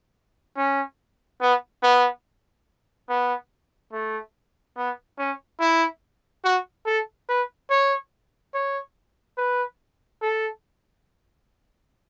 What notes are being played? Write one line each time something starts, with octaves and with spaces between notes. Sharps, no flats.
C#4
B3
B3
B3
A3
B3
C#4
E4
F#4
A4
B4
C#5
C#5
B4
A4